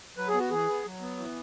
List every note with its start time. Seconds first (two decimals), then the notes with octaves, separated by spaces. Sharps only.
0.17 F#3 B4
0.28 G#4
0.34 B3
0.39 F#4
0.50 E3 G#4
0.67 B3
0.85 F#3
1.01 B3
1.18 E3